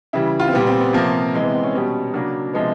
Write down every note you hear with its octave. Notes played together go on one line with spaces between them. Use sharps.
C#3 E3 G3 E4
F4
C4
A#2 G3 B3
C4
B3
C3 F3 A#3
C3 E3 G#3
B3
C4
C#4
B2 G3 B3
C#3 F#3 A#3 D4
C3 F3 G#3 B3